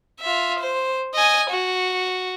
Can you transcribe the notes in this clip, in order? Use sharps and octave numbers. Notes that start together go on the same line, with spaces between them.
F4 E5
C5
D#5 G#5
F#4